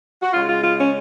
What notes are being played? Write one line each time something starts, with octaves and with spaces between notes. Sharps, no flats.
F#4
C#3 G#3 F4
F4
F4
C#4